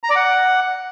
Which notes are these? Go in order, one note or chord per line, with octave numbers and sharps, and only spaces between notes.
A#5
D5
F#5